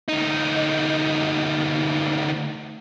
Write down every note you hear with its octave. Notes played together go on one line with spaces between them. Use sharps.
D2 D#4